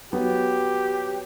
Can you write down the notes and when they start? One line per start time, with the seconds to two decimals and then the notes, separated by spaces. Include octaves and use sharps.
0.13 F#3 B3 G4